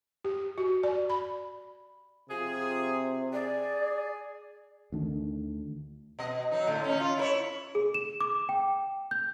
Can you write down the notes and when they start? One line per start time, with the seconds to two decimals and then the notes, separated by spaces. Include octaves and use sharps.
0.25 G4
0.58 F#4
0.83 D5
1.10 B5
2.29 C3 F3 F4 G#4
3.33 G#4 D5
4.92 D2 D#3 D4
6.19 B2 D#5
6.51 F#3 D#4
6.67 A2 D3
6.84 C#4 D#4
7.00 F4
7.17 E4 A#4 C#5
7.75 G#4
7.94 E7
8.20 D6
8.49 G5
9.11 G6